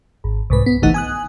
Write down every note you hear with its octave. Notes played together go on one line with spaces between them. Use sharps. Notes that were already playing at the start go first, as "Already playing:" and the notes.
G#1
C2 G#2 B4
B3
G1 C2 E3 A3 D#4 F#5
G#5 D#6 F#6